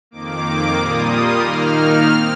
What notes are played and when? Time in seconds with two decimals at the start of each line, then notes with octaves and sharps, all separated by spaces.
0.11 F2 D#3 A#3 D6
0.76 A#2 G3 A#3 F4 D#6
1.40 D#3 A#3 D#4 F6
2.05 C4